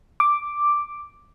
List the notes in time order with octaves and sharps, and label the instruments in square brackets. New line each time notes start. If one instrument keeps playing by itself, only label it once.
[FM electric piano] D6